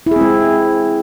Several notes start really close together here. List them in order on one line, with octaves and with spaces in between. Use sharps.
E4 G#4 C4 G#3